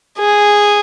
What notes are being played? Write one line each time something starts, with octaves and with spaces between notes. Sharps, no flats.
G#4